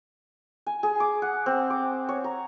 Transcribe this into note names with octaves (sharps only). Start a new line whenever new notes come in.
G#5
G#4
D6
F#5
C4
D6
C#5
A#5